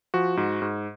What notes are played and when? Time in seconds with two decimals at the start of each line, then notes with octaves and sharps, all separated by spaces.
0.14 F3 F#4
0.37 G#2
0.62 G#2